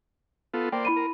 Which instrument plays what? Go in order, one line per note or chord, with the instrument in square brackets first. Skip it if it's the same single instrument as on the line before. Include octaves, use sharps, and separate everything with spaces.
[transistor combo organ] B3 F4 A4
[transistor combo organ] A#3 C5 D5 [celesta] G5
[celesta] E4 B5 D#7
[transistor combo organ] A#4